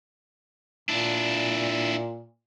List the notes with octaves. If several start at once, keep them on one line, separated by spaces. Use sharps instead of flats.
A#2 D4 E4